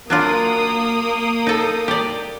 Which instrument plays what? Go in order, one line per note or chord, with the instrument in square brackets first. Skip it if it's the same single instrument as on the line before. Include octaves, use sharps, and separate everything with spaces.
[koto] F#3 D4 F4 [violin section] A#3 D#6
[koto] D#4 A4
G4 D5